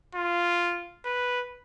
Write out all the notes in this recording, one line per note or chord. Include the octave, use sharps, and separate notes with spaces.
F4
B4